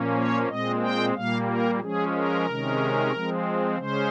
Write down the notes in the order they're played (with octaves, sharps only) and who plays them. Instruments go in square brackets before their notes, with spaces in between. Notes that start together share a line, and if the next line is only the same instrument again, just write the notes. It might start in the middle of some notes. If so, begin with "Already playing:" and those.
Already playing: [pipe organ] A#2 F3 A#3 C#4
C#5
A#2 G#3 C4 D#5
G5
A#2 G3 A#3 F5
A#4
F3 G#3 C#4 G#4
A#4
C3 D#3 G#3 C#4
F3 G#3 C4
C#3 G#3 C#4 C5